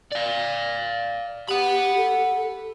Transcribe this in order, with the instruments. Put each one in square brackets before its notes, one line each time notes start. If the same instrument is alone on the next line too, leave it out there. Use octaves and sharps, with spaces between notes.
[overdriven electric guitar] D5 F5
[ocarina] G4 [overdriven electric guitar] F#5 B5
[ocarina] A4